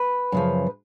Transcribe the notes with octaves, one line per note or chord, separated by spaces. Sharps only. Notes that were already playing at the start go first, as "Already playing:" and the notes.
Already playing: B4
F#2 C#3 F3